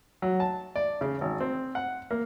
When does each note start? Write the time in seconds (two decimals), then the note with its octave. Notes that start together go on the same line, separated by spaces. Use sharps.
0.22 F#3
0.40 A5
0.76 D5
1.01 C#3
1.21 G#1
1.40 C4
1.75 F#5
2.11 A#3